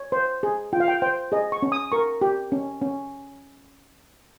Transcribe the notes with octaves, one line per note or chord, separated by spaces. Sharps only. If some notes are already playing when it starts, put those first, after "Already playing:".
Already playing: C#5
C5
G#4
F4 G5
F5
G5
C5 G5
G#4 D#5
C#6
C#4
D#6
A#4 C#6
G4
C#4
C#4